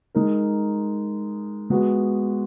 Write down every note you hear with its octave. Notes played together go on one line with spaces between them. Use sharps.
G#3 D#4 A#4
G#3 B3 F#4